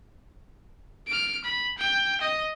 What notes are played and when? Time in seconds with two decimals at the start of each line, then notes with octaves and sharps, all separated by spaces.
1.08 F6 D7
1.45 B5
1.78 G5
2.21 D#5